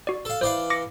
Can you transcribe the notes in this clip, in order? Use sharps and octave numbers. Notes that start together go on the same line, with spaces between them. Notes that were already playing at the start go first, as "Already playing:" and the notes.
F#4 D5
A4 F5
E3 C5 D5 F5
D6 A#6 C#7